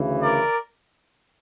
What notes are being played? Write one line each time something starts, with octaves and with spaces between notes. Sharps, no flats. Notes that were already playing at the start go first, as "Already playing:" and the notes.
Already playing: D2 C#3 E3
A#4 D5